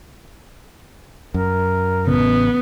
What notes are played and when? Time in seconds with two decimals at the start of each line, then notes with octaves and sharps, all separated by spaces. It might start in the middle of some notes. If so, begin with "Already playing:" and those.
1.34 F#2 A#4
2.07 A1 C#3 B3